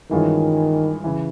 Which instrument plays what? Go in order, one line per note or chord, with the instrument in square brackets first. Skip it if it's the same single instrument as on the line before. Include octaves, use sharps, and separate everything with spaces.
[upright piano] G2 E3 G#3 C#4 F4 [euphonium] D#3
[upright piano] C#3 E3